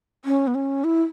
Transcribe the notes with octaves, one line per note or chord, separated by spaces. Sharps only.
C#4
B3
C#4
E4